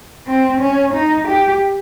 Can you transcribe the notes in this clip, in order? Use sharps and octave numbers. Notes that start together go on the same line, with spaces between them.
C4
C#4
D#4
G4